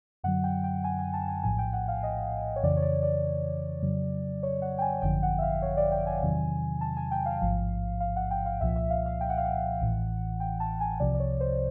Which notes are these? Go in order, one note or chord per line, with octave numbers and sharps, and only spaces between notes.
F#2 D3 F#3 F#5
G5
G5
G#5
G#5
A5
G#5
A#1 A2 F3 G#5
G5
F#5
F5
D#5
C#5
F2 C#3 E3 D5
C#5
D5
D5
F2 C#3 F#3
C#5
F#5
G5
G#5
G#1 F#2 D3 F3 G5
F#5
E5
F5
C#5
D5
G5
G#5
E2 C3 D#3 F#3
A5
G#5
G5
F5
A1 G#2 F3 F5
F5
F#5
G5
F5
C2 A#2 F3 E5
E5
F5
F5
G5
F#5
F5
F#5
A1 A2 E3
G5
A5
G#5
C2 C3 F3 D5
D5
C#5
C5